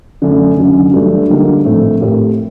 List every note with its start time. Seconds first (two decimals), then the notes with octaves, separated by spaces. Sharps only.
0.22 F#2 D3 F#3 A3 D4
0.57 F#1 F#2 D3
0.94 G2 F#3 A3 D4
1.29 D3 G3 A#3 D#4
1.65 A#1 A2 A3 C4
2.00 A2 A3 C4 G4 A#4